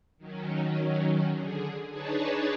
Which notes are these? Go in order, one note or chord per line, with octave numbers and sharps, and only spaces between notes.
D#3 F#3 C#4
D3 G#4
D4 D#4 G#4 B4 C#5 A5